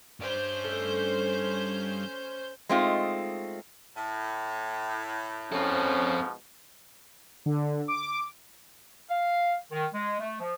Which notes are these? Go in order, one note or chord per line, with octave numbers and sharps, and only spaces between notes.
G2 C#4 C5 D5 G6
A3
G#3 A3 C4 D#4 F4
A2
G#2 B2 F3 C4 C#4 A4
D3
D6
F5
D#3
G#3
A3
F3